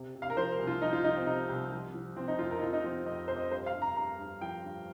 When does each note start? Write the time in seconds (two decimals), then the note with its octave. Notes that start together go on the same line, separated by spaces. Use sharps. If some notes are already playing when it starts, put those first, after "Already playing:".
Already playing: C3
0.15 C3
0.22 F5
0.30 A#4
0.37 F3 C5
0.52 A#4
0.59 C2
0.67 F4
0.82 F3 D#4
0.93 F4
1.04 F3 D#4
1.16 C4
1.27 C3 D#4
1.49 C2
1.72 F3
1.94 F3
2.16 F3 C4
2.28 D#4
2.39 F2 F4
2.51 A#4
2.58 D#4
2.62 F2 F4
2.73 D#4
2.84 F3 C4
3.06 F2 D#5
3.28 F2 C5
3.36 D#5
3.51 G2 C5
3.66 F5
3.74 G2
3.82 A#5
3.96 G2 A#5
4.19 G2
4.41 F3 G5
4.64 G2